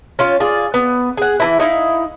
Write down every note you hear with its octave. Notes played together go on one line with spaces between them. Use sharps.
C#4 F4 F5
F4 G#4 D5
B3
G#4 F#5
E3 D#4 E4
D#4 E4 F5